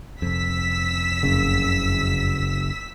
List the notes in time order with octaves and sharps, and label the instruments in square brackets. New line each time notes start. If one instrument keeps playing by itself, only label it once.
[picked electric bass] F1 F2 [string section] E6 B6
[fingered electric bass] F#1 C#3